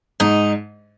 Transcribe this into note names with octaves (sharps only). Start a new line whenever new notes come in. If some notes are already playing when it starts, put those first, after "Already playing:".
G#2 D#4